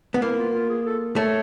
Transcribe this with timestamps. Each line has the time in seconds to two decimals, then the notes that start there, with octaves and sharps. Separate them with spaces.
0.14 B3
0.22 A#3 E4
0.38 F4
0.54 F4
0.69 G#4
0.86 A4
1.16 A3 C#5